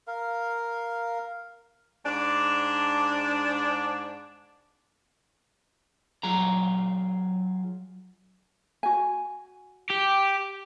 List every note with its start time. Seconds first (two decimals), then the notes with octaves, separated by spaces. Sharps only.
0.07 A#4 F5
2.06 G#2 D4
6.23 F#3 F4 G#4 A#5
8.83 F#4 G#5
9.90 G4